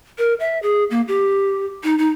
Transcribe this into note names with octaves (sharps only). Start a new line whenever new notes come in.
A#4
E5
G#4
A#3
G4
D#4
D#4